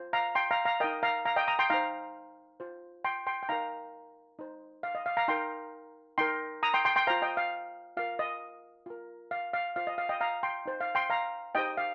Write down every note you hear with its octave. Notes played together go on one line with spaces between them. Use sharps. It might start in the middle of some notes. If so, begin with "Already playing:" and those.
Already playing: F4 C5
F5 A#5
G5 C6
F5 A#5
F5 A#5
D#4 A#4 D#5 G5
F5 A#5
F5 A#5
D#5 G5
A#5 D#6
G5 C6
D#4 C5 F5 A#5
F4 C5
G5 C6
G5 C6
G5
D#4 A#4 F5 A#5
D#4 C5
F5
D#5
F5
F5 A#5
D#4 A#4 G5 C6
D#4 A#4 G5 C6
A#5 D#6
G5 C6
G5 C6
G5 C6
F4 C5 F5 A#5
D#5 G5
F5
F4 A#4 F5
D#5
F4 A#4
F5
F5
F4 C5 F5
D#5
F5
D#5 G5
F5 A#5
G5 C6
D#4 C5
F5
G5 C6
F5 A#5
D#4 G4 C5 D#5 G5
F5